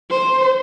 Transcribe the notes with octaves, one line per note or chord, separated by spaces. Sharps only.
C5